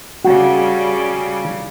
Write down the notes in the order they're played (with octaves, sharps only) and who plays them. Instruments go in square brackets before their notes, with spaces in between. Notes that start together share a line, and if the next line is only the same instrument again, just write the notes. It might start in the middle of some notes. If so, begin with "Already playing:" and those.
[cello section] C#3 G3 [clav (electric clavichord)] F#4